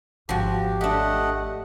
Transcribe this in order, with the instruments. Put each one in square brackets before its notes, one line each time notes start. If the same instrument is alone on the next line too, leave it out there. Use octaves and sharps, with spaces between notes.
[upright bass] G#1 [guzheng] F3 F#4 [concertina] G4
[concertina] A3 D#5 F#5 [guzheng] D4 G4